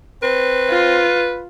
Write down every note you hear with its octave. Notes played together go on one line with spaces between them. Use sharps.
C4 B4
F4